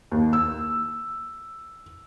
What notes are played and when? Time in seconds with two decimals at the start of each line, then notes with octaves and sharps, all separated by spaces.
0.11 D#2
0.33 E6